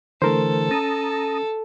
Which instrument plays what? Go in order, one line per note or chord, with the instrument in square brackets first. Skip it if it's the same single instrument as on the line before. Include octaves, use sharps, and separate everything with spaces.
[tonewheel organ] D3 E3 [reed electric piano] A3 A#4 C5 [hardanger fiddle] A4
[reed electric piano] C#4 [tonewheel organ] A5 A#5 D#6